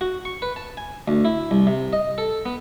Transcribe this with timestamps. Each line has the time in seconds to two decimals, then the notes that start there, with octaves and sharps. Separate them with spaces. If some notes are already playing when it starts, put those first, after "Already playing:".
0.01 F#4
0.25 C#6
0.42 B4
0.56 A5
0.77 G#5
1.08 D2
1.25 E4
1.51 C2
1.67 C3
1.93 D#5
2.18 A4
2.46 B3